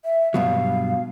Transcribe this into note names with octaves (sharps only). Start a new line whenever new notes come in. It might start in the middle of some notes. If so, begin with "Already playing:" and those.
E5
G2 B2 F#3 F5